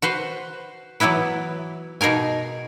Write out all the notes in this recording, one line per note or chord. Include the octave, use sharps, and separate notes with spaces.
F#4 B4 C5
E3 F#3 B3 E4 B4
B2 D#4 G#4 A#4 G#5